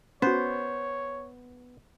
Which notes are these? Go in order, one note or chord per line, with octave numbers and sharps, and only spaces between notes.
B3 C#4 F#4 C5 C#5